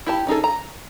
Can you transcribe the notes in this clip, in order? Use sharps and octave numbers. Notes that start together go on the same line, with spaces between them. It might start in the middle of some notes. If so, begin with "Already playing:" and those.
E4 G4 A5
C#4 D#4 G#4 A4
A#5